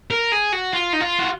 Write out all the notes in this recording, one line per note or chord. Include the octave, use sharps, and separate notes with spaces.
A#4
G#4
F#4
F4
D#4
F4
F#4